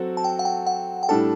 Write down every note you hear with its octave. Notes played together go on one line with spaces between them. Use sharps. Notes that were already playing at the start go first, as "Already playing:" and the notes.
Already playing: F#3 C4 F#4 A4
A5
G5
F#5
G5
F#5
G5
A2 G3 D4 A4 A5